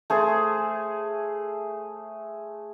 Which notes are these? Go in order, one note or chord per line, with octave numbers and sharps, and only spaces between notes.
A3 G#4 C5